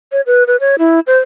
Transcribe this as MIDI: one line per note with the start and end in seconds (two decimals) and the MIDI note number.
0.12 0.21 73
0.27 0.44 71
0.47 0.56 71
0.60 0.76 73
0.79 1.00 64
1.07 1.18 72